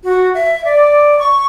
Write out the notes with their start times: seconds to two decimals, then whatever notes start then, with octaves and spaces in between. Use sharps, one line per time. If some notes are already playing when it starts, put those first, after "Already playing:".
0.04 F#4
0.34 E5
0.65 D5
1.19 C#6